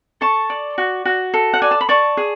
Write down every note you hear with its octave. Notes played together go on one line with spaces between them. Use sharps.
A4 A5 C#6
D5
F#4
F#4
A4
F#5
D5 G#5
A5
B5
D5 A5 C#6
G#4